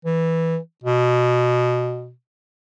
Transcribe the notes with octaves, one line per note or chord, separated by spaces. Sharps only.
E3
B2